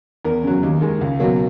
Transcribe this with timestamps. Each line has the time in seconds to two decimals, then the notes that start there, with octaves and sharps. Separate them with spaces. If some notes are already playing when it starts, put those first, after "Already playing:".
0.25 E2 A#4
0.43 C#3 F#3
0.63 D#2
0.81 D#3 G#3
1.01 C#2
1.20 B2 F#3 A#3